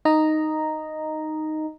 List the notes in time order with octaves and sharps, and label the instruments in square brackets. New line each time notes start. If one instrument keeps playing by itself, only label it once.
[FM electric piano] D#4 D#5 A#5